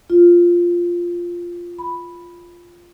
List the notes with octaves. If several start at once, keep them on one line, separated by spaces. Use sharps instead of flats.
F4
B5